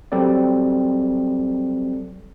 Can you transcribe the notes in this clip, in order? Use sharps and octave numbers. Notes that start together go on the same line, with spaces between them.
F#3 G3 C4 A4 D5